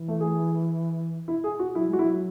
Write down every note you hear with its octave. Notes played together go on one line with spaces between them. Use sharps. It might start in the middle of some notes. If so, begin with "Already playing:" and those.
Already playing: E3
A3
G#4
E4
G#4
F#4
F#3 E4
G#3 F#4
E4
F#3